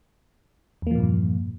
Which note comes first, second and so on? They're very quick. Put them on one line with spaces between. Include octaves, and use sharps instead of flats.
E2 A#3 F3 A#2 G2